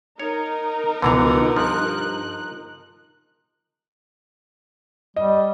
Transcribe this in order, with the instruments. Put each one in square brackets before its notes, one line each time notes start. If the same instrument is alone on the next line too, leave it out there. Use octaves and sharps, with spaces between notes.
[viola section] D#4 A#4 [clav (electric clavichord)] C#5
[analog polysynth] C#2 B2 F3 [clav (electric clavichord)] D3 E3 A#5 [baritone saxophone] B3
[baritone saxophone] G2 [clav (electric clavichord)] F3 [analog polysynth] F#6
[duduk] G3 [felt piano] D#5